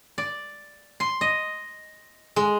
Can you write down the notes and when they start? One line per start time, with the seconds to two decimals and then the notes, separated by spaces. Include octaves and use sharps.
0.18 D5
1.00 C6
1.21 D#5
2.36 G#3